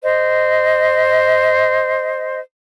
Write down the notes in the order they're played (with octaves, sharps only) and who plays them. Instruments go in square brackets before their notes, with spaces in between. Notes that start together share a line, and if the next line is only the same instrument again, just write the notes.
[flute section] C5 D#5